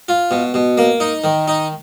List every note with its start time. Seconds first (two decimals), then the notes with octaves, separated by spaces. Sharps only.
0.08 F4
0.31 B2
0.54 B2
0.78 A#3
1.00 D#4
1.24 D#3
1.48 D#4